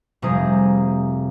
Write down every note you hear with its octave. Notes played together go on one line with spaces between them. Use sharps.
F1 C3 G3 G#4 A#5 D#6